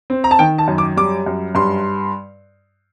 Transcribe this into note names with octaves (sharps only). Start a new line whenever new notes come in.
C4
A#5
A5
D#3 G5
A5
F#2
D6
G3 D6
F#2
G2 C6